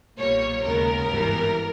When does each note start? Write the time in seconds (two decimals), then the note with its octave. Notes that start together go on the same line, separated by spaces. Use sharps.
0.18 B1 A#2 G3 A#3 C#5
0.63 D#2 C#3 G#3 B3 A#4
1.08 G#1 G2 E3 G3 B3